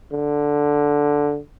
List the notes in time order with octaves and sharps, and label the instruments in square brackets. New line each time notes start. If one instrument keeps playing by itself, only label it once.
[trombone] D3